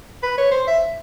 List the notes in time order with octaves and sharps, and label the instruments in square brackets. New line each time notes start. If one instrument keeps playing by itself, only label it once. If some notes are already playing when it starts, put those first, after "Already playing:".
[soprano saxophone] B4
C#5
C5
E5